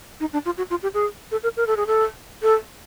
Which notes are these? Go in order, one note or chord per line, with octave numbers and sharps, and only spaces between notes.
D#4
D4
F4
F#4
F4
G4
G#4
A4
A#4
A#4
A4
G#4
A4
A4